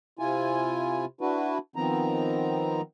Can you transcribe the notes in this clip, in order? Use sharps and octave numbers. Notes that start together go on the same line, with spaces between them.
C3 E4 F4 G#5
D4 E4 F#4 B4
D#3 F3 B3 C4 A#5